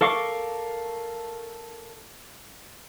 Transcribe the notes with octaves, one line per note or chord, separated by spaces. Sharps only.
A4 A#4 F5 C#6 D6